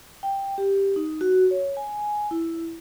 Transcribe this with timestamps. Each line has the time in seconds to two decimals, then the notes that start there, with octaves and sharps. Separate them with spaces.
0.23 G5
0.58 G4
0.96 D#4
1.21 F#4
1.51 C#5
1.77 G#5
2.31 E4